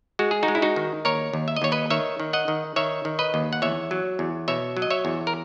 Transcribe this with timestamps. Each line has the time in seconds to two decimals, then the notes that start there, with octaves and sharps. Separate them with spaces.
0.19 G#3 F#4
0.31 G#4
0.43 D#4 F#4
0.48 G#3
0.55 E4
0.62 D#4 F#4
0.76 D#3
1.05 D#2 A#4 C#5
1.33 D#2
1.48 E5
1.57 D#5
1.62 D#2 C#5
1.72 B4 D#5
1.90 D#3 C#5 E5
2.20 D#3
2.33 D#5 F#5
2.48 D#3
2.76 D#3 C#5 E5
3.05 D#3
3.19 B4 D#5
3.34 D#2
3.53 F#5
3.62 E2 C#5 E5
3.91 F#3
4.19 E2
4.48 B2 C#5 E5
4.77 F#3
4.82 D#5
4.90 C#5 E5
5.05 E2
5.27 A#4